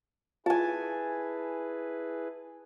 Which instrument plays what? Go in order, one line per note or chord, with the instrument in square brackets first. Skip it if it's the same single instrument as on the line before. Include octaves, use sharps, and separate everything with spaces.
[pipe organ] E4 G#4 B4 [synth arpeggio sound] F4 [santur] G#5 A5